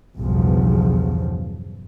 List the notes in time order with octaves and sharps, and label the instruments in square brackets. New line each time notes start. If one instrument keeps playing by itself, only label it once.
[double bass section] B1 E2 G2 C#3 F3